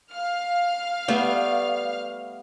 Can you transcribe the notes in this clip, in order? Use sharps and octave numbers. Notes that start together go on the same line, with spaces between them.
F5 F6
G3 A3 B3